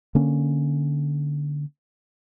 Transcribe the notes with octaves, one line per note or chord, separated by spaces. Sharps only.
D3 A#3 C#4